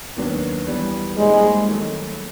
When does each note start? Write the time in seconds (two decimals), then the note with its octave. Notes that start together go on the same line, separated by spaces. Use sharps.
0.17 D#2 D#3 F#3 B3 D4
0.67 E3 G3 B3
1.18 A#2 G3 G#3 C4 D#4 G#4
1.69 D#3 F#3 A3